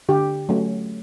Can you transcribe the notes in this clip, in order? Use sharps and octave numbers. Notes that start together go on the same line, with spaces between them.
D3 G4
F#3 A3 C#4